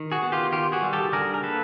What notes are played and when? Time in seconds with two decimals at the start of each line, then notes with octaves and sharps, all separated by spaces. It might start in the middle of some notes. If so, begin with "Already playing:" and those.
Already playing: D#3
0.12 F#4 G#4
0.23 B3
0.32 F4 G4
0.52 D#3 F4 G4
0.72 F#4 G#4
0.82 G3
0.93 G4 A4
1.12 D3 G#4 A#4
1.34 A#4
1.43 A#3 A4 B4